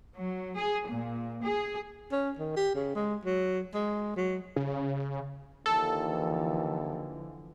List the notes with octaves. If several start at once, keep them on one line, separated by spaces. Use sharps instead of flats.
F#3
G#4
A#2
G#4
C#4
D#3
G4
C#3
G#3
F#3
G#3
F#3
C#3
D#2 D3 E3 F3 A4